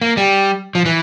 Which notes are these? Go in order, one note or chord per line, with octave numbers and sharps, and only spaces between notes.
A#3
G3
F3
E3